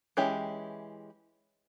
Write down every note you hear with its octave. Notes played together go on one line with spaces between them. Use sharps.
E3 G#3 C#4 E4 G4